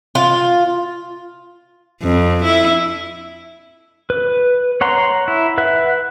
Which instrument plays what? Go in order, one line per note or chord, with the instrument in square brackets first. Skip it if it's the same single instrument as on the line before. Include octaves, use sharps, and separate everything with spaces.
[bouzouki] F4
[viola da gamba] F2
E4
[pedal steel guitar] B4
C#5 F#5 A#5 C6
E4
B4 E5 F#5